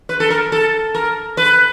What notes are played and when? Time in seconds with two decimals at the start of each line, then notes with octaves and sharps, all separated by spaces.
0.09 B4
0.20 A4
0.30 A#4
0.52 A4
0.95 A#4
1.37 B4